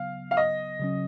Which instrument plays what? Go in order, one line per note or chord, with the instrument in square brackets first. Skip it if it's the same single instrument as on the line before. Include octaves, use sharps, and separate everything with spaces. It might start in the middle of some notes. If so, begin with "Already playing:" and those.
Already playing: [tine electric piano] C#3 F#3 B3 [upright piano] F5
[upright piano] F5
D#5
[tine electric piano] C#3 F#3 C#4